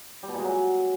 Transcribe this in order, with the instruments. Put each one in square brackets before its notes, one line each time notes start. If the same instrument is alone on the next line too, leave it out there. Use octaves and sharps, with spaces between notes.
[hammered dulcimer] G3
B2
A#2
G#3
F#3